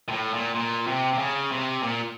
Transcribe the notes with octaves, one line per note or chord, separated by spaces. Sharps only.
A#2
A2
A#2
A#2
C3
C3
C#3
C3
A#2